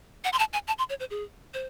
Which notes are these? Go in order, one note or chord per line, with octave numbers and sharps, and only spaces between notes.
F#5
C6
A5
G#5
A5
C6
C#5
C5
G#4
C5